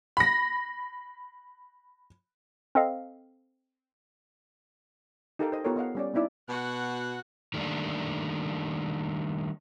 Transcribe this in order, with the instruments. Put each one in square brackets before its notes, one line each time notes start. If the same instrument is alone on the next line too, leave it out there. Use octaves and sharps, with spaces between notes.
[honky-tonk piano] B5 A#6
[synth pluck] C4 A4 D#5 F5
[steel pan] D#4 G4 A4 A#4 F5 G5
C5 D#5
B3 F4 G4 A4 A#4 C#5
B3 D#5 F5 F#5
G3 C#4 D5
B3 C4 D#4 E4 D5
[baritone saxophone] B2 [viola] F#4 F#5
[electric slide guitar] D#3 G3 A3 A#3 D4